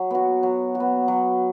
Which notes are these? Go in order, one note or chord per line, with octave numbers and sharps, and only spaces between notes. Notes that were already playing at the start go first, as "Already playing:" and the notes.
Already playing: F#3
B3 F#4
F#3
F#4
B3
F#3